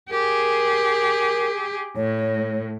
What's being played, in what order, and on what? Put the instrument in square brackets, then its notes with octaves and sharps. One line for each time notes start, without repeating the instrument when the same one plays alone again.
[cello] G4 G#4 [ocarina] A#4
[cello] A2 [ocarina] C#5